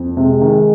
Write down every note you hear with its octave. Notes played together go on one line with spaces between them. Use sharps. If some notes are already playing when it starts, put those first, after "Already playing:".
Already playing: F2
C3 G#3
D#3